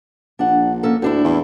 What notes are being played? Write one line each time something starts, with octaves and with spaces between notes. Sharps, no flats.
A#1 D4 F#5
A#3 C#4 A4
D2 A2 D4 E4
E2